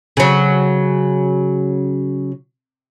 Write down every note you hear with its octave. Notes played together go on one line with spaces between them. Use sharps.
C#3 F#3